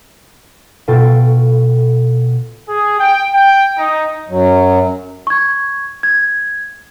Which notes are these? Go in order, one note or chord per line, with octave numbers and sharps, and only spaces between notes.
B2 F4 A4 G5 C#6 A6
G#4
G5
G5
D#4
F#2 F#3
C#6 G#6
G#6